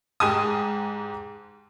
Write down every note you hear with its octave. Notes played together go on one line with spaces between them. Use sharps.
G#2 G#3 G4 G#5 A5 D#6